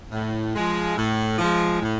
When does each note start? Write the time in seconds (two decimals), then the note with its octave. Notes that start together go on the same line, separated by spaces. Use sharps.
0.12 A2
0.54 F3 G#3
0.96 A2
1.38 F3 G#3
1.81 A2